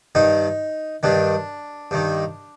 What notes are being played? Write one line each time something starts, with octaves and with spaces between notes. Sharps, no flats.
G2 D#3 D#4
G2 D#3 D4
G2 D#3